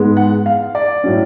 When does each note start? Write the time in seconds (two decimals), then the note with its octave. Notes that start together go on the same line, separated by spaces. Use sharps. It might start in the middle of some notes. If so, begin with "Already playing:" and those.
Already playing: G#2 G#3 B3
0.17 F#5
0.46 F5
0.75 D5
1.04 A2 F#3 C#4